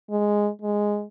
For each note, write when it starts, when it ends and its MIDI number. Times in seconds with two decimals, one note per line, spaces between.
0.10 0.50 56
0.62 1.04 56